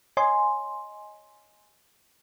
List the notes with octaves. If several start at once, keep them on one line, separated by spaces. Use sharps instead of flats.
C#5 D#5 G#5 C6